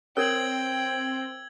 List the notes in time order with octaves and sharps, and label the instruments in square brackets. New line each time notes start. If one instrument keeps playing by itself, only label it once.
[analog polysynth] C4 [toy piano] A#4 C#5 [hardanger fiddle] G5 [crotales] E6 G#6 F#7